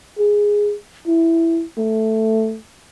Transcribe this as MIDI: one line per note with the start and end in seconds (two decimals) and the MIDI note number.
0.19 0.75 68
1.07 1.64 64
1.78 2.57 57